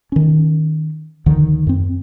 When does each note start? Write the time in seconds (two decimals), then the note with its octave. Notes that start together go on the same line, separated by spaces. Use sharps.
0.12 D#3 C#4
1.26 D2 D3 D#3 F3
1.67 F#2 C4